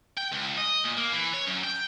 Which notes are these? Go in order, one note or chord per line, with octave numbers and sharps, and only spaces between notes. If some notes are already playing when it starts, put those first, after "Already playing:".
G5
C#2
D#5
A#2
A#3
E3
C#5
F#2
G5